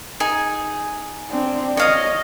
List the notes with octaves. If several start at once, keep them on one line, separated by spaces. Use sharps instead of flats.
D#4 G#4 G#5
C4 D4
C#5 D#5 F5 D#6